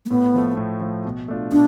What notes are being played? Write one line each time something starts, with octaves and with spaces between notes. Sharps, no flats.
A3
A2 B3
F3 A3
A2
F3 A3
B2
A3 D4 F4
B2 D4